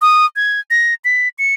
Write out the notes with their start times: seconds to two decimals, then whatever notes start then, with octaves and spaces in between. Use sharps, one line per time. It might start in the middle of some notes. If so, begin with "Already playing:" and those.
0.02 D#6
0.36 G#6
0.70 A#6
1.05 B6
1.39 C#7